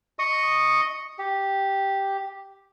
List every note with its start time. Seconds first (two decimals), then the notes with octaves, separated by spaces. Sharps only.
0.19 D#5 C#6 D#6
1.19 G4